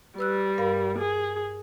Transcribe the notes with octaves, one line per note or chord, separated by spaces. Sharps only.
G3 B4 E6 F#6
G2 A#4 F5
G#4